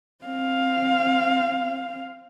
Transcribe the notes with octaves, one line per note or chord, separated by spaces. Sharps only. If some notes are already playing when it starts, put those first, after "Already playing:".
C4 F5